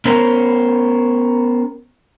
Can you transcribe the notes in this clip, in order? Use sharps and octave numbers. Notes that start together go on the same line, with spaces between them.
B3 C#4 A#4 C5